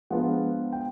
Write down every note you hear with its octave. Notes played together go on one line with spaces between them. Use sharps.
F3 G#3 B3 D4 F4 F#5
G5